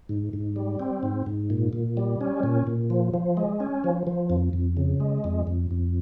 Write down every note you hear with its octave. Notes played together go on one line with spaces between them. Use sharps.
G#2
G#2
G3
C4
G#2
G#2
A#2
A#2
G3
C#4
A#2
A#2
F3
F3
G#3
C#4
F3
F3
F2
F2
C#3
G#3
F2
F2
F2